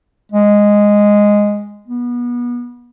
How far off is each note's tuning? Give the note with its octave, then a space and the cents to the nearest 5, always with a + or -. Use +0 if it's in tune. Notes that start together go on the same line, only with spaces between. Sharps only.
G#3 -5
B3 -30